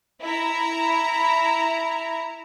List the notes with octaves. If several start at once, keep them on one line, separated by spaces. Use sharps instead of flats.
E4 A#5